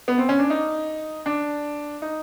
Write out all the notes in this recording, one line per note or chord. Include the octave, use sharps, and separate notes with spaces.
B3
C4
C#4
D4
D#4
D4
D#4